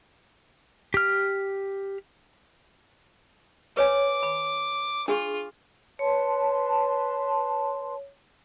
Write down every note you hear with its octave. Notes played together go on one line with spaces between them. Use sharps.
G4 F6
B4 C#5 G#5 D6
B5
D4 F4 G#4 C#6
B4 C#5 A5 C6